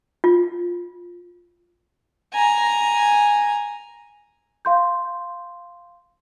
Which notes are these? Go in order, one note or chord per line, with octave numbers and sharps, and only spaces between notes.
F4
G#5 A#5
F5 C6 G6